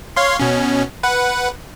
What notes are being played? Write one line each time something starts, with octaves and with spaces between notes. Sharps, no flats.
C#5 F5 C6
B2 C#4
B4 F#5